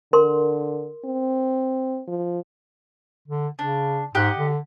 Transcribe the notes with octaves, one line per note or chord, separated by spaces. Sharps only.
D3 A#4 C6
C4
F3
D3
C#3 D4
G#2 G4 D#5 F#5
D3